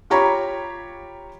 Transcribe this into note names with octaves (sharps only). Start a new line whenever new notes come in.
F4 G4 C#5 A#5 B5 C#6